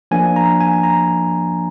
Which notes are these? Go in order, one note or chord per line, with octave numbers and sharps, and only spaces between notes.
F3 A#3 D4 G#5
A#5
G#5
A#5